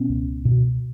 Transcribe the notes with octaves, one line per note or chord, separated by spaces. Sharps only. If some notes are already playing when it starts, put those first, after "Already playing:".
Already playing: B2 B3 C#4
C#2
B2